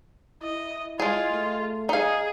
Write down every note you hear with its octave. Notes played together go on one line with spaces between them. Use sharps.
E4 D#5
G#3 F4 G#4
A3
D#4 G#4 F5